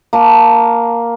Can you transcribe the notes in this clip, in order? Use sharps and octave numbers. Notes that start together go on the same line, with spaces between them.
A#3 A5